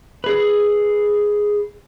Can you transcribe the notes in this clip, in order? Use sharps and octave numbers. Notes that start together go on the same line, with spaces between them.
G#4 B4